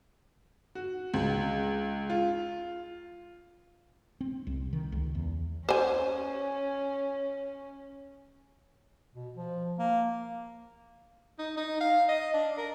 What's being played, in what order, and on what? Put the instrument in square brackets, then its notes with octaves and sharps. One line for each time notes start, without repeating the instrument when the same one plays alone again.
[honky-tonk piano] F#4
C#2
F4
[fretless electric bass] C4
C2
D#3
C#2
E2
[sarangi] C#4 [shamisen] C5 G#5
[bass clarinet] B2
F3
A#3
[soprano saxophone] D#4
D#4
F5
D#5
D4
A#4